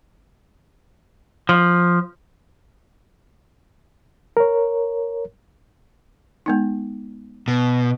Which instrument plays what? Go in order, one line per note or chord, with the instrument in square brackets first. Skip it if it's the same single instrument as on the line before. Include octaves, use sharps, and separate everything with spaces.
[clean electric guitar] F3
[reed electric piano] A#4 C#5
[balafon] G#3 B3 D#4
[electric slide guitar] B2